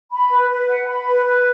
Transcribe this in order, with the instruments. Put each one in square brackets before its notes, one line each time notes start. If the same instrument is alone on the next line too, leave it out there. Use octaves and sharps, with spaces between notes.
[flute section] B5
B4
B4
F#5
B5
B4
B4